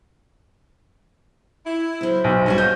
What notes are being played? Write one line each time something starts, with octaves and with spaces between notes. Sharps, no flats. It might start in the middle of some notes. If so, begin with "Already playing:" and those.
E4
C#3 F#3 C5
B1
G2 G3 C#4 F#4
F#4 D#5 F5 G6